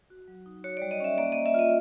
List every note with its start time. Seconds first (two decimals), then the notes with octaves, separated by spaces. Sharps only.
0.10 F#4
0.28 F#3
0.46 D#4
0.64 F#4 C#5
0.77 D5
0.82 G3
0.91 D#5
1.00 C#4 E5
1.18 A#3 D5
1.32 D#5
1.36 A#3
1.46 E5
1.54 F4 D#5